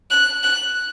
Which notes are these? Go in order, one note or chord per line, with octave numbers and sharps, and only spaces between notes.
F#6
F#6